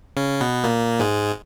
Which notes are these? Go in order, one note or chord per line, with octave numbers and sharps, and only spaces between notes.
C#3 C#4
B2 B3
A#2 A#3
G#2 G#3